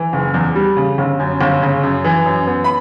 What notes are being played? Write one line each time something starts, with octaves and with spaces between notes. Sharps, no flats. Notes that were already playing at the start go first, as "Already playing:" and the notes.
Already playing: E3
F#1
E2
G3
C#3
G1
F#2
G1
C#3
F#2
E3
F#2
B3
B5